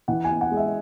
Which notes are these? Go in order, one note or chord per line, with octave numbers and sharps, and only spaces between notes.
E3 F#5
G#5
B3
F#5
G#3
E5